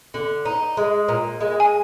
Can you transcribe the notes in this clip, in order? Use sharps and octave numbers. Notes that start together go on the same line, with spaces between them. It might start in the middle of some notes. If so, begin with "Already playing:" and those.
D3
D#4
G#3
A#2
G#3
G#5